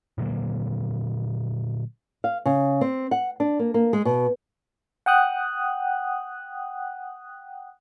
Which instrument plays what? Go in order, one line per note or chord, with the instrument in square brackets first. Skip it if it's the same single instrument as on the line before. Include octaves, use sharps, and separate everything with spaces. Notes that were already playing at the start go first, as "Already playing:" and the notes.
[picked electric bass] A#2 D3 F#3 A#3
[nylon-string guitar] F5
C#3
C4
F#5
D4
A#3
A#3
G#3
B2
[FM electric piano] F#5 G5 D#6 F#6